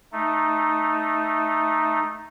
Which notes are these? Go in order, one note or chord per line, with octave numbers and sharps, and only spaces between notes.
A3 D#4